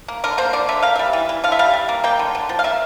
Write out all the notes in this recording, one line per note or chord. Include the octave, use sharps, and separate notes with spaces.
A#3
D3 A#4
A#3 C5
D3 D5
D3 E5
A#3 F5
G3 E5
E3
E3
D3 F5
E5
G3 F5
G3
A#3
A#3 G5
D3
D3
F3
F5
A#3 E5